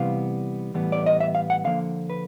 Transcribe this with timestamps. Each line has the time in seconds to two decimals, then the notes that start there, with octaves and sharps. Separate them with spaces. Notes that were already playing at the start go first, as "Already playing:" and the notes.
Already playing: C3 E3 G3 B3 F5
0.75 A2 E3 G3 B3
0.92 D5
1.06 D#5
1.20 E5
1.35 F5
1.50 F#5
1.64 D3 F3 A#3 F5
2.10 B4